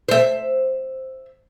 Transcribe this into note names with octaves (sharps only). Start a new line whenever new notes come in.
C5 E5